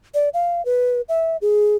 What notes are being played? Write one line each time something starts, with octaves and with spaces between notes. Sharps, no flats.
D5
F5
B4
E5
G#4